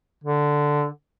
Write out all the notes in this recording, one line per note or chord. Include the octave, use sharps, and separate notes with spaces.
D3